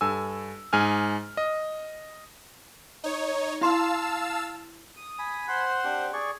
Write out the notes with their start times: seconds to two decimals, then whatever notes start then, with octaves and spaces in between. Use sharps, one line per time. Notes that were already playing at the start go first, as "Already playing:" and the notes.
0.01 G2 A4 G#5 E6
0.73 G#2 G#4 G#5 F6
1.37 D#5
3.04 D#4 C#5
3.61 E4 F5 A5 C6 E6
4.97 D#6
5.19 G#5 B5
5.48 C5 F#5 C6
5.84 C4 D4 G4
6.13 G#4 D5 C#6